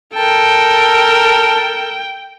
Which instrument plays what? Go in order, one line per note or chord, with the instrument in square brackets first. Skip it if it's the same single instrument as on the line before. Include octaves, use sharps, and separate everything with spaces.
[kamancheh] A4 A#4 [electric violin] G5 [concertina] A5